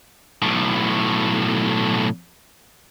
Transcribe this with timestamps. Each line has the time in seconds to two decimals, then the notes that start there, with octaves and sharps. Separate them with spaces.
0.42 B1 A2